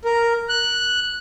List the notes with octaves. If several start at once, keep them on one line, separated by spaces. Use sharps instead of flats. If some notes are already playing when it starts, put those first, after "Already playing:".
A#4
F#6